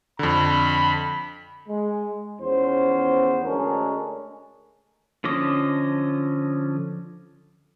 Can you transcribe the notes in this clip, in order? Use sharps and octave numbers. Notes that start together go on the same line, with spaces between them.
F2 D3 B5
G#3
E2 F3 B3 C#4 C5
D2 G#3 C#4 D4 A#4
D3 F3 C#4 D#5 D6